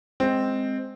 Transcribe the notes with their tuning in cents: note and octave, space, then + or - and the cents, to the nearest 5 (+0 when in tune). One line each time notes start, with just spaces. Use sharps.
G#3 +0 C4 +0